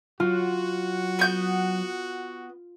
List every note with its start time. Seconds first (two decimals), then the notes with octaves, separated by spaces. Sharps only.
0.20 F#3 F4 F#4
1.19 B3 G6